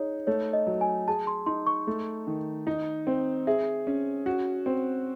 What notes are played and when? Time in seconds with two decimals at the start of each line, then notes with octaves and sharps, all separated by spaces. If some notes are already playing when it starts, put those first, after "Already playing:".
Already playing: D#4 G#4 C#5
0.27 A3 C#5
0.53 D#5
0.67 F#3
0.81 G#5
1.08 G#4 A5
1.27 C6
1.46 D#4 C6
1.67 C#6
1.87 A3
2.27 D#3
2.67 D#4
3.07 C4
3.47 G#4 E5
3.87 C#4
4.26 F#4
4.66 C4